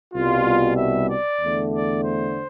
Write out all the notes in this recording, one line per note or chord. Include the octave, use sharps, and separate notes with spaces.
C2 B2 G3 F4
E5
D5
E2 D3 A3
D5
C5